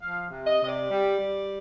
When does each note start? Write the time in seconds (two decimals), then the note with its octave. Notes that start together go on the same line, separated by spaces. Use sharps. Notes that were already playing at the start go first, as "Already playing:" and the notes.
0.02 F3 F5
0.31 C3
0.45 D#5
0.61 C3 D#5
0.68 D5
0.90 G3
1.18 G3